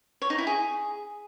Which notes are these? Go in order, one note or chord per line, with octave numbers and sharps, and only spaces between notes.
C#5
D#4
E4
G#4